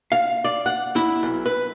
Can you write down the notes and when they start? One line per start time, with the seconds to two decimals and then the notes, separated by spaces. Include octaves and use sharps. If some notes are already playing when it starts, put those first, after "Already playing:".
0.12 F5
0.44 D5
0.66 F#5
0.96 E4
1.23 B1
1.46 B4